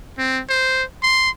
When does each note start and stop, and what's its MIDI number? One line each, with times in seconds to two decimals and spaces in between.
0.18 0.41 60
0.49 0.83 72
1.03 1.30 84